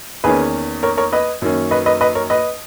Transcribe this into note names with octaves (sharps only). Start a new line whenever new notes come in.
E2 D#3 A#3 C#4 G#4 B4
A#4 C#5
A#4 C#5
B4 D#5
F#2 D#3 A#3 C#4
B4 D#5
B4 D#5
B4 D#5
A#4 C#5
B4 D#5